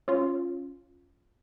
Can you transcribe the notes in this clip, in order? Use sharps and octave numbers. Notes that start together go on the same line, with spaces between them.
C#4 F4